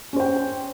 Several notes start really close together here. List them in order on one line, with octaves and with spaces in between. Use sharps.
C#4 C5 G5